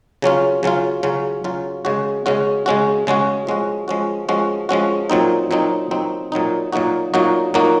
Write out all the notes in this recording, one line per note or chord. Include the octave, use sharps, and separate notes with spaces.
C#3 F#3 C#4 F4
C#3 F#3 C#4 F4
C#3 F#3 C#4 F4
C#3 F#3 C#4 F4
C#3 G#3 C#4 F#4
C#3 G#3 C#4 F#4
C#3 G#3 C#4 F#4
C#3 G#3 C#4 F#4
F3 G#3 C#4 F#4
F3 G#3 C#4 F#4
F3 G#3 C#4 F#4
F3 G#3 C#4 F#4
A#2 F#3 C4 D#4
A#2 F#3 C4 D#4
A#2 F#3 C4 D#4
A#2 F#3 C4 D#4
A#2 F#3 A#3 D#4 F#4
A#2 F#3 A#3 D#4 F#4
A#2 F#3 A#3 D#4 F#4